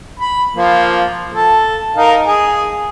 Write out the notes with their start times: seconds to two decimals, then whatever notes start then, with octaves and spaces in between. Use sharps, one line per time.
0.20 B5
0.55 F3 A#3
1.34 A4
1.96 D#4 A#4 F5
2.25 G#4